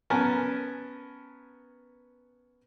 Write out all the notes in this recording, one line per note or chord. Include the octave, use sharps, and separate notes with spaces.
B3 C#4 A#4 G#5 A5